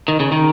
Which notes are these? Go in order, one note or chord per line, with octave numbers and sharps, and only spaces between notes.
D#3
C#3
D#3